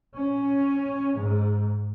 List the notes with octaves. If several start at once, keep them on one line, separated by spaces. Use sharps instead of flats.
C#4
G#2